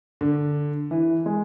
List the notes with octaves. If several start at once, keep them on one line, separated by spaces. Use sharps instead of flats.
D3
E3
G#3